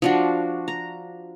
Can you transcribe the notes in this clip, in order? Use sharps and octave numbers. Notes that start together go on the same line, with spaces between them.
F3 D4 F#4
A#5